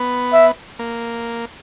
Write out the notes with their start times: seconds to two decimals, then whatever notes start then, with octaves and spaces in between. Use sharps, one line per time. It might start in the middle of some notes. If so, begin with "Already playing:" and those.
Already playing: B3
0.33 E5
0.79 A#3